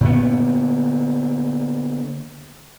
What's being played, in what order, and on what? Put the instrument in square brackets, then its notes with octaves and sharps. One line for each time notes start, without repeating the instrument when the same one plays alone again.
[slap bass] A#2 D3 B3